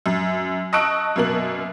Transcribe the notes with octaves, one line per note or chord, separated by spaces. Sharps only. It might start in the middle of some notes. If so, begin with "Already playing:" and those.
F#2
D#5 A5 C#6 E6 F#6 D7
F#2 B2 A#3 A#4 F#7